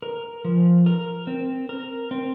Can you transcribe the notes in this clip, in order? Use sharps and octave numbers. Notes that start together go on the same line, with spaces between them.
A#4
F3
A#4
C4
A#4
C4